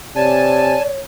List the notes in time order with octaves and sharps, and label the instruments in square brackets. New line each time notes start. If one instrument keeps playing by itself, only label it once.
[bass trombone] C3 [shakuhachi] C#5 [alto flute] D5 [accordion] G#5 A5